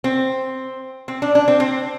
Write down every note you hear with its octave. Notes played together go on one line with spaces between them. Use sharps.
C4
C4
D4
D4
C4
C4